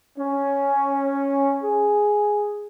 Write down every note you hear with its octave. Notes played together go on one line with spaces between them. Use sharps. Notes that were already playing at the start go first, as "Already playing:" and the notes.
C#4
G#4